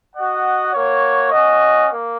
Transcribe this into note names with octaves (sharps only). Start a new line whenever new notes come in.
F#4 D#5 F#5
A#3 F#4 C#5
C#4 F#4 D#5
A#3